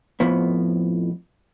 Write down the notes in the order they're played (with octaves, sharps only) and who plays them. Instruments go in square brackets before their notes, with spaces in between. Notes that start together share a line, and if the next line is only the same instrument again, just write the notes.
[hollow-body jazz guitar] F2 A2 F3 B3